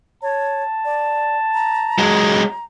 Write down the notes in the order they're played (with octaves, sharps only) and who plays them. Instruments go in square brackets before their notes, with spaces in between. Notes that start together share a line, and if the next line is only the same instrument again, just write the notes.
[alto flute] C#5 [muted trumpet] A5
[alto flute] D5
A#5
[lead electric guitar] F#3 G#3